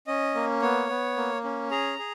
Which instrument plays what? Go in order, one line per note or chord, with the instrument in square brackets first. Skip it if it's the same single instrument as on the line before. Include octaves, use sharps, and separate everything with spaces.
[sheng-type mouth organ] C#4 D#5
A#3
B3 C#5
B3
A#3
C#4
G#4 A#5
G#4